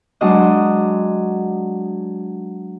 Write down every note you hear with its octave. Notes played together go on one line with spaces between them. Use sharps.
F#3 G#3 D4 C5 D#5 F#6